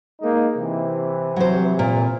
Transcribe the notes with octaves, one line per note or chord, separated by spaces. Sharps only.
G#3 A#3 D#4
C3 E3
F#3 C5
A#2